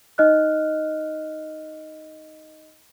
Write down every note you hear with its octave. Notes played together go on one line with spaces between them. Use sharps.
D#4 D#5 F6 F#6